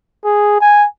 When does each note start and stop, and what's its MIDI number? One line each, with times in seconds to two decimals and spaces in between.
0.25 0.59 68
0.61 0.86 80